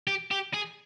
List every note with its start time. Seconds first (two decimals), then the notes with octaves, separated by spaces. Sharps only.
0.07 G4
0.31 G4
0.54 G#4